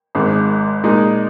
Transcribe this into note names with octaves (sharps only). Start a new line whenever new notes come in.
G#1 G#2 G#3
A#2 G#3 D#4